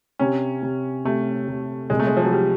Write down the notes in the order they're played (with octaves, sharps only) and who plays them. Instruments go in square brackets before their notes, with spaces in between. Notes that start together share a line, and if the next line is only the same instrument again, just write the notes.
[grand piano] C3 [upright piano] C#4
[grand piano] C3
[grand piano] C3 [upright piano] A3
[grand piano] C3
[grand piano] C2 [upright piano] G#3
[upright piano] A3
G#3
F3
F#3
G3